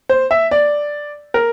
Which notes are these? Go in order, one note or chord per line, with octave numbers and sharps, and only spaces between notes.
C5
E5
D5
A#4